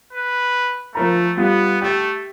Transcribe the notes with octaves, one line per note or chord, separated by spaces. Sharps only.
B4
F3 A3 A#4 A#5
G3 B3 F4
A3 G4